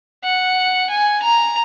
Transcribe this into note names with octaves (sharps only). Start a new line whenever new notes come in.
F#5
G#5
A#5